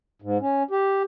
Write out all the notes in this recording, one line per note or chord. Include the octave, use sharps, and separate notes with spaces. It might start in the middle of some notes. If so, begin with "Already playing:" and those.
G#2
C#4
G4